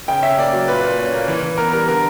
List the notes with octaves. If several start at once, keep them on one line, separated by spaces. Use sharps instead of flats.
C#3 G5
C#4 E5
A#3 D5
F#3
A#2 B4
A#2
C#4
A#3
E3
E3
B3 A#4
G3 A#4
D3 A#4